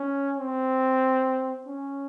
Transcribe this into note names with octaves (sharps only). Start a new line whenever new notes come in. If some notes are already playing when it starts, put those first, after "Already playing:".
Already playing: C#4
C4
C#4